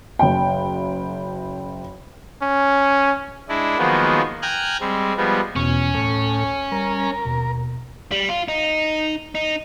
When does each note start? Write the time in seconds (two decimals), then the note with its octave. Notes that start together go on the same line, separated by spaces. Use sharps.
0.19 F#1 G5
2.42 C#4
3.48 G#3 D4 E4
3.78 D#3 F3 F#3 G#3 A#3 B3
4.42 G5 G#5 A#5 F6 F#6 G#6
4.80 G3 G#3 C4
5.17 F3 G3 G#3 B3
5.56 E2 B2 C#4
5.95 D2 A2 C#5
6.72 G3 A#4
7.25 D#2 B2
8.12 G3
8.29 F4
8.48 D#4
9.35 D#4